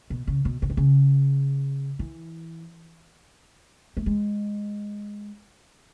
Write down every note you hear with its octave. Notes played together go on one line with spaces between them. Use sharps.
B2
C#3
B2
C#3
D#3
C#3
E3
A3
G#3